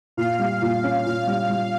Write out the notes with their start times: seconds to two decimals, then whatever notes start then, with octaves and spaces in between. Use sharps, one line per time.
0.17 A#2 F5
0.39 G3
0.62 A#2
0.84 C#4
1.05 A#2 F5
1.27 G3
1.50 G3